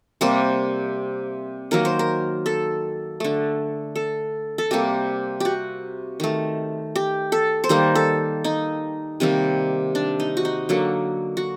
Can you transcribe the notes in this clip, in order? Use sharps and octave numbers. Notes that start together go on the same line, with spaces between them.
C3 G3 A#3 C5
D#3 F#3 A#3 A#4
C5
A#4
A4
D3 A3
A4
A4
C3 G3 A#3 G4
F#4 G4
D#3 A3
G4
A4
C5
D#3 G3 A#3 A#4
A4
D#4
C3 D#3 G3 A#3
D4
D#4
F#4
D#4
D3 F#3 A#3
F#4